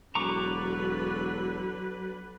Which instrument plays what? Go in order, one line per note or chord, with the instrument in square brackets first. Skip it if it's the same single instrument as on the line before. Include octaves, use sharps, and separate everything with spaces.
[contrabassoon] E1 [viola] D3 B4 [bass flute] F#3 [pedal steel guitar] A#5 C#6 D6